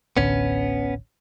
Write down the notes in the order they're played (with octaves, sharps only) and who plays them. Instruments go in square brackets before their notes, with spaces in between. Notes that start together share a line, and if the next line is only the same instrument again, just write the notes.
[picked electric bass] D1 A1 D3 [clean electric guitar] B3 C#4